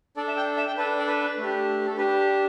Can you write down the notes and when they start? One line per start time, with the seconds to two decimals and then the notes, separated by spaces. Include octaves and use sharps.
0.17 D4 A4 D5
0.27 E5
0.37 G5
0.57 E5
0.67 G5
0.77 D4 A4 B4
0.99 D5
1.07 B4
1.38 A3 D4 G4
1.86 A4
1.97 D4 G4 B4